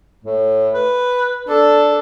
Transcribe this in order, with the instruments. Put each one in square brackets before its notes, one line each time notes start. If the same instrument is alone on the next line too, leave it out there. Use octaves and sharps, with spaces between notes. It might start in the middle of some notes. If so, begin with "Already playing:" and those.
[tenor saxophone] A2
B4
[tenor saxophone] D4 [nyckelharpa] A4